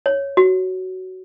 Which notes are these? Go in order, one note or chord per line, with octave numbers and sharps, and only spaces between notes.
C#5
F#4